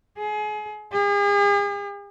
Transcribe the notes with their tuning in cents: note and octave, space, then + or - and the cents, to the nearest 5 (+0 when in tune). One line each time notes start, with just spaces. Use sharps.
G#4 +30
G#4 -45